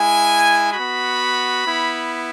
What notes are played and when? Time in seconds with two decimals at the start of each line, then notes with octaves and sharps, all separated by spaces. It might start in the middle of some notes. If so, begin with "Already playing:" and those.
Already playing: G#3 E4 G#5
0.72 B3 F#4 B5
1.64 B3 E4